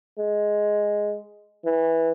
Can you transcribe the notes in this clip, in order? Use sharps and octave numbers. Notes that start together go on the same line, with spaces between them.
G#3
E3